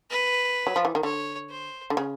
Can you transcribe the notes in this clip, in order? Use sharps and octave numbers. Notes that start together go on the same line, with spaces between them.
B4
F#3
F3
E3
D#3
D3 C#5
C5
D3
C#3